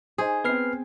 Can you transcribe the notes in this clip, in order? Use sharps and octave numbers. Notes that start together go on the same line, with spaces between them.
D#4 G#4 C5
B3 C4 B4 F6 C7